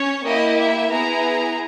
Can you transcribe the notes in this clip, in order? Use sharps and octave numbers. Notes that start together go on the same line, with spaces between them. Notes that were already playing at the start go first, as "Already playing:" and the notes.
Already playing: C#4 C#5
A#3 E4 G4 D#5
E5
B3 E4 G#4 A#5